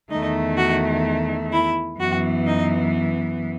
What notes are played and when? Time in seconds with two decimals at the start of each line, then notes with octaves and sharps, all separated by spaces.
0.11 E2 D#3 A3 D#4
0.57 F#4
1.53 E4
1.99 F#2 E3 B3 F#4
2.47 D#4